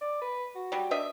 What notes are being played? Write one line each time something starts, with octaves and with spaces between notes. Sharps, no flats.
D5
B4
F#4
F#3 G3
D4 D#5 E5